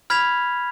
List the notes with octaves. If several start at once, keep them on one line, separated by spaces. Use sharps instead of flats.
B5 F6 G#6 B6 F7